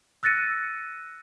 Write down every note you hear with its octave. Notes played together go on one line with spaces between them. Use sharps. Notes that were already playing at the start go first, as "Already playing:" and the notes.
E6 F#6 A6 A#6 C#7 D#7